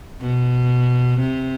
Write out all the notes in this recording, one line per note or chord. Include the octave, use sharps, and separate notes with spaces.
B2
C3